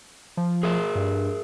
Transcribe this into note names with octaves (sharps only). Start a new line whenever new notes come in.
F3
G#4 A#4 E5
G2